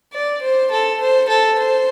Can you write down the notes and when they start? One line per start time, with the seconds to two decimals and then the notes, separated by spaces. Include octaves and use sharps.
0.14 D5
0.42 C5
0.71 A4
1.01 C5
1.29 A4
1.59 C5